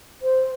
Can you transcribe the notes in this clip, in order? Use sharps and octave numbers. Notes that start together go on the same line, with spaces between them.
C5